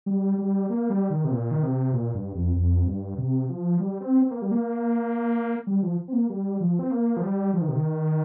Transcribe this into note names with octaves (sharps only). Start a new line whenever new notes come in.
G3
G3
A#3
G3
D#3
C3
A#2
D#3
C3
A#2
G2
F2
F2
G2
C3
F3
G3
C4
C4
A#3
G3
A#3
G3
F3
C4
A#3
G3
F3
C4
A#3
F3
G3
F3
D#3
C3
D#3